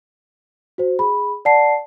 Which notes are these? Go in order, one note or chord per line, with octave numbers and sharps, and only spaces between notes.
F#4 C5
G#4 B5
D5 F#5 A5 C7